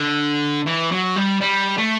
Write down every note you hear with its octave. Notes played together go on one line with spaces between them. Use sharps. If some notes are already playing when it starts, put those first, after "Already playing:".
Already playing: D3
E3
F#3
G3
G3
A3